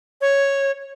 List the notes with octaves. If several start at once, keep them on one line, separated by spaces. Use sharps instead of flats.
C#5